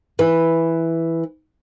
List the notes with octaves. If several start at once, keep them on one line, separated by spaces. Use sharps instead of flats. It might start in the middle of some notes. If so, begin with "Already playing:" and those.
E3 B4